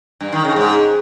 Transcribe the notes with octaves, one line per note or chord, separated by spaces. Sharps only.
G2
D#3
C#3
G#2